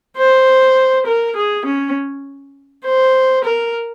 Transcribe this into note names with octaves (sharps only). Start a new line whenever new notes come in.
C5
A#4
G#4
C#4
C5
A#4